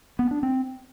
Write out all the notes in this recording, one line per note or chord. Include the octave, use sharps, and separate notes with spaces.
B3
D4
C4